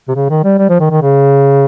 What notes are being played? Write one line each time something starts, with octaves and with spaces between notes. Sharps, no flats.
C3
C#3
D#3
G3
G3
F3
D#3
D#3
C#3